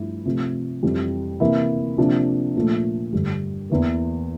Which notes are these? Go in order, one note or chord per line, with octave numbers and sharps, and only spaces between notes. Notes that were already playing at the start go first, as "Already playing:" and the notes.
Already playing: G2 F3 A3 E4
C3 F3 A3
F2 E3 G3
C3 E3 A#3 E4
C3 F3 A#3 D4
A#2 F3 A3
G2 D3 G3
E2 E3 A#3